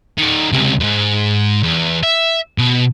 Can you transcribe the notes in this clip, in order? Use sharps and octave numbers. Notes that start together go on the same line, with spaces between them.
D#3 D5
C#2 C3
E2 G#2
E2
E5
B2